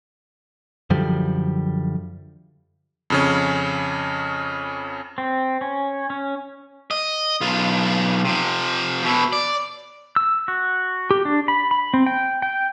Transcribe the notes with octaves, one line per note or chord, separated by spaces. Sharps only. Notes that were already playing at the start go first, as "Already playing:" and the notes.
F#2 D3 F3 G3
F2 C#3 C#4
C4
C#4
C#4
D#5
B1 F4
C3 F3
B2 E4
D5
E6
F#4
G4
D4
B5
B5
C4
G5
G5